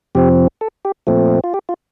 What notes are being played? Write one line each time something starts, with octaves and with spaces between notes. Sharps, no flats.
F2 C3 F3 C4 G4
A4
G4
A#2 F3 A3 C4
F4
G4
F4